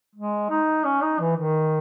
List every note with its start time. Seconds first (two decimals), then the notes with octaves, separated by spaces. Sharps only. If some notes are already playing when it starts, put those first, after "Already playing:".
0.15 G#3
0.50 D#4
0.85 C#4
1.02 D#4
1.20 E3
1.37 D#3